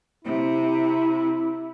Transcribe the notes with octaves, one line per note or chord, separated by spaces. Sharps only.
C3 E4